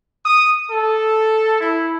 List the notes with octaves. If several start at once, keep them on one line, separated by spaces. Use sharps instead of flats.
D#6
A4
E4